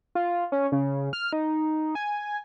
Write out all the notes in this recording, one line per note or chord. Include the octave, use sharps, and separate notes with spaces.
F4
C#4
C#3
F6
D#4
G#5